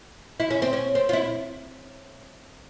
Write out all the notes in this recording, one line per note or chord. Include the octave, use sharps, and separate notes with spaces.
E4
C#4
C4
C#4
C4
F4
E4